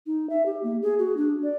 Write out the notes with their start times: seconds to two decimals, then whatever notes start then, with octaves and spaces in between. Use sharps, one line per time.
0.06 D#4
0.29 E5
0.46 G4
0.64 A#3
0.82 G#4
0.99 F#4
1.17 D4
1.43 D5